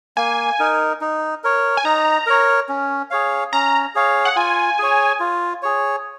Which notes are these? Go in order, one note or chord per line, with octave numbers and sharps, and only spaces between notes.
A#3 G#5
D#4 A#4
D#4
A#4 C#5
G#5
D#4 A#5
A#4 C#5
C#4
G#4 C#5 F5
C#4 A#5
G#4 C#5 F5
F#5
F4 G#5
G#4 C#5
F4
G#4 C#5